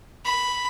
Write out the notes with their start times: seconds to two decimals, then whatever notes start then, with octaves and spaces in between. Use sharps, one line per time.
0.25 B5